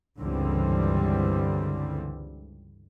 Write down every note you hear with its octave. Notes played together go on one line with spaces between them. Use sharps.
C#2 G2 D3 E3 G3 C4